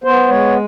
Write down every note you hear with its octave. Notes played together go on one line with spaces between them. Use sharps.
B3 C5
G#3 C#5